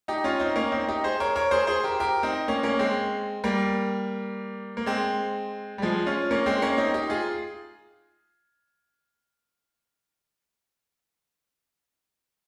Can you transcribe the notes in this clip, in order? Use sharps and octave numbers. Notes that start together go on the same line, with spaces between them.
D#4 G4
C#4 F4
C4 D#4
A#3 C#4
C4 D#4
D#4 G4
G#4 C5
A#4 C#5
A#4 C#5
G#4 C5
G#4 C5
G4 A#4
G4 A#4
C4 D#4
A#3 C#4
A#3 C#4
G#3 C4
G3 A#3
A#3
G#3 C4
G3
F3 G#3
C#4 F4
A#3 C#4
G#3 C4
A#3 C#4
C4 D#4
D#4 G4
F4 G#4